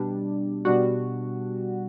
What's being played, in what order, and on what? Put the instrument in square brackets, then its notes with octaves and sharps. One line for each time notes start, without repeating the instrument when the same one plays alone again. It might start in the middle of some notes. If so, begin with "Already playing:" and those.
Already playing: [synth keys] B2 G3 D4
B2 G3 D4 F#4